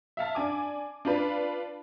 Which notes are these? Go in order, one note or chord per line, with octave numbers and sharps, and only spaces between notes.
E5 F5 A5
D4 G#5 D6
D4 F4 B4